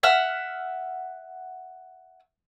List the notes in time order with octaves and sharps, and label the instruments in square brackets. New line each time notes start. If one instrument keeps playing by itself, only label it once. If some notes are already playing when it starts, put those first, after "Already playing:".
[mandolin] E5 F#5 F6